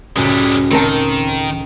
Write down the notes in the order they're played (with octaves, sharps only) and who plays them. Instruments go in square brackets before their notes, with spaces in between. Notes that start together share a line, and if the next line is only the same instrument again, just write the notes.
[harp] C#2 A2 [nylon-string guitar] F#2 [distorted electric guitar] G3 G#3
[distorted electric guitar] D#3 [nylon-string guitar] C4 A#4 A5